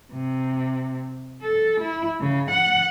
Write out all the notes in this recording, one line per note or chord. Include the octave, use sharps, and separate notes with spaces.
C3
A4
E4
C#3
F#5